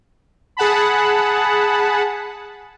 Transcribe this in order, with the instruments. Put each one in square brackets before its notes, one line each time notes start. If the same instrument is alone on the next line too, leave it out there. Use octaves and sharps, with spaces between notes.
[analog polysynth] G#4 F#5 A5 B5